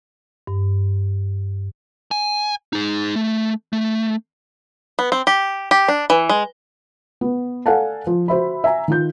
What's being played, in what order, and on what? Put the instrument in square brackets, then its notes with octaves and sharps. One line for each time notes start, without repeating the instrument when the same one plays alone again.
[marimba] G2
[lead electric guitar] G#5
D#4 G#4
A3
A3
[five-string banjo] B3
C4
G4
G4
D4
E3
G#3
[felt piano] B3
A4 D5 F5 F#5 G#5 A5
F3
F#4 C5 E5 B5
E5 G#5 A#5
D#3 F4 G6